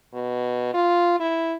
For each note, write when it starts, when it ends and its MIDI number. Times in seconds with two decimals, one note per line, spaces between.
0.14 0.73 47
0.74 1.19 65
1.20 1.56 64